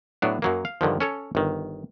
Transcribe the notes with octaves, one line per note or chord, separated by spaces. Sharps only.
A2 F#3 B3 D4
F#2 F#3 A#3
F5
G2 D3 D#3 F3
C#4 A4 C#5
G1 D#3